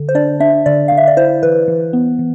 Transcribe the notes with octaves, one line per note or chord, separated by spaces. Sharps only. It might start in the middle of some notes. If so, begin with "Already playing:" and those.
Already playing: D3
C5
D4 D5
D4 E5
D3 D5
D3 F5
E5
D5
E4 C5
E3 B4
E3
B3
E3